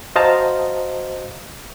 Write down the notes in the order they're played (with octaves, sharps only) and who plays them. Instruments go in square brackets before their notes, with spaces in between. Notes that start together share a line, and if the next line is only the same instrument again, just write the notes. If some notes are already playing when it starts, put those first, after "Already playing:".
[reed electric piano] F#4 C5 D#5 F5 A5 A#5